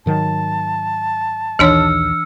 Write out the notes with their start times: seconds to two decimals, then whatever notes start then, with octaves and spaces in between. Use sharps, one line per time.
0.06 G#2 D#3 F#3 A5
1.59 A#1 D#2 E3 D4 C#5 E6 F6 C#7